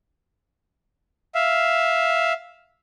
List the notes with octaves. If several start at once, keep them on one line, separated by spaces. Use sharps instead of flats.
E5 F5